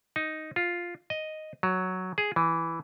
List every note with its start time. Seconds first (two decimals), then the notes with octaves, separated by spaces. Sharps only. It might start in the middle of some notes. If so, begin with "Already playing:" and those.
0.16 D#4
0.56 F4
1.10 D#5
1.63 F#3
2.18 G#4
2.36 E3